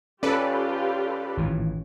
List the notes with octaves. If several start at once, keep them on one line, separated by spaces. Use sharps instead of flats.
C#4 F4 G4 A4 B4 D5
G#1 A2 E3